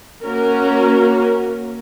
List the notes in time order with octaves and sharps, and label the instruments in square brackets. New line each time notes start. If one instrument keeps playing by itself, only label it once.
[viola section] A#3 C#4 F#4 A#4